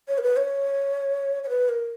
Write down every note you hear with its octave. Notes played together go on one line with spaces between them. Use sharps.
C#5
A#4
B4
C#5
C#5
B4
A#4